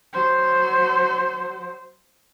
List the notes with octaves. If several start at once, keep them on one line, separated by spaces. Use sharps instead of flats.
F#3 C5